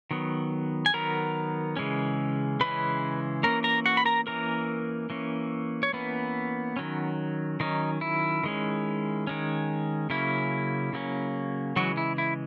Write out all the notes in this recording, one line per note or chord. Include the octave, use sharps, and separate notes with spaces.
D#3 F#3 B3
G#5
D#3 F#3 B3 A#4 A#5
C#3 E3 G#3 C#4
C#3 E3 G#3 C#4 B4 B5
E3 A#3 C#4 A#4 A#5
A#4 A#5
F#4 F#5
B5
A#4 A#5
E3 A#3 C#4 A#4 A#5
E3 A#3 C#4
C#5
E3 A#3 B3 C#4 B4
D#3 F#3 C#4
D#3 F#3 C#4 D#4
E4
D#3 G#3 C#4
D#3 G#3 C#4
C#3 F#3 A#3 C#4 E4
C#3 F#3 A#3 C#4
C#3 E3 F#3 G#3 F#4
E4
E4